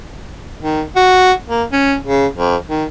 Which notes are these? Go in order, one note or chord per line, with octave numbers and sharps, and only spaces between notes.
D#3
F#4
A#3
C#4
C#3
F2
D#3